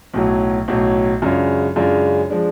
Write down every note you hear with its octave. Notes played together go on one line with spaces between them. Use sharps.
B1 A2 F#3
B1 A2 F#3
F#2 C#3 G#3 D4 F4
F#2 C#3 G#3 D4 F4
F3 G#3 D4